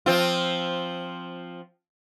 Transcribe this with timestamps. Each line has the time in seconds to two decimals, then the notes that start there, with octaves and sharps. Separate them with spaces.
0.06 F3 C4 F4